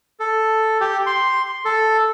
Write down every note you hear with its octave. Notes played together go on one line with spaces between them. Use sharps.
A4
G4
C6
A4